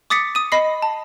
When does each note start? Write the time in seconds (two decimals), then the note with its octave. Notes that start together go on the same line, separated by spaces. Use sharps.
0.10 D6 D#6 A6 B6 C#7
0.35 D#6 D#7
0.52 D#5 B5 A#6 C7
0.82 A5